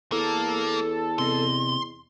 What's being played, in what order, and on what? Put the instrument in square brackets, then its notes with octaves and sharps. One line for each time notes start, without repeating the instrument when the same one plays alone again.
[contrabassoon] E2 [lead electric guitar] A#3 [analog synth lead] A4
[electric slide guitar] C3 B3 D#5 [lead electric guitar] C6